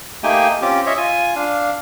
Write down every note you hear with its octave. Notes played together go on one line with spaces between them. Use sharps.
A3 A#3 D#4 G4 G5 G#5
C4 C#4 F4 G4 D6
C#5 D#5 E5
F4 G#5
D4 F5